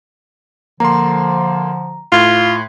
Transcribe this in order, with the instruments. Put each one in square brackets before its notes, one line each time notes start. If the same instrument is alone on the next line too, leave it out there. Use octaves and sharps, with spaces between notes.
[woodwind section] D3 F3 [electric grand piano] A#3 C6 [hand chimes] A#5
[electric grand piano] A2 [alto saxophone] F4 [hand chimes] C6 G#6